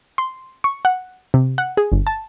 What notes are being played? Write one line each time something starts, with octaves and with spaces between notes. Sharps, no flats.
C6
C#6
F#5
C3
F#5
G#4
G1
A5